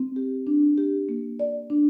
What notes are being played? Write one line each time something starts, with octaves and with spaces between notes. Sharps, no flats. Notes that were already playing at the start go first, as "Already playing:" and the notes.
Already playing: C4
G4
D4
G4
A#3
D5
D4